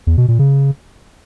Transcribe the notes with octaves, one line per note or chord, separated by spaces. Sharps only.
E2
B2
A#2
C#3